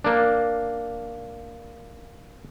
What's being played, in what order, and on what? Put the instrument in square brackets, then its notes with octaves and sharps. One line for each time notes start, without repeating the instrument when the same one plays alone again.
[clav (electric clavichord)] A#3 D4